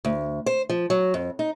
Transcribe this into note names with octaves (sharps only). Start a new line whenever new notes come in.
D2
C5
F3
F#3
F2
D#4